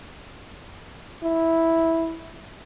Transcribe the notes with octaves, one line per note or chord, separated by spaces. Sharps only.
E4